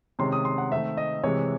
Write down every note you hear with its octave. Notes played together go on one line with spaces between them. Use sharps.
C3 D#3 G#3 C#4 C6
D#6
C6
F#5
D#3 A3 C4 E5
D#5
C3 E3 G#3 C#5